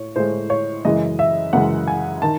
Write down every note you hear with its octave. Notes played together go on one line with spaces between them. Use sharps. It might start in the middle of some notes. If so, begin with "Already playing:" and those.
Already playing: A2 C#5
A2 G#3 C5
C#5
F#2 C#3 E3 G#3 D#5
E5
F#2 C#3 E3 G#3 F#5
G#5
D#3 A5